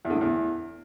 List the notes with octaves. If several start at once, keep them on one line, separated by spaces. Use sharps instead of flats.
E2
D3
A2
E2